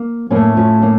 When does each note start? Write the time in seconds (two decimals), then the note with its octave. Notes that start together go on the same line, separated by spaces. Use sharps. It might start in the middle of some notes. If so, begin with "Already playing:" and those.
Already playing: A#3
0.31 A2 A3 A#3 C#4
0.57 C#4 F4
0.82 A#3 C#4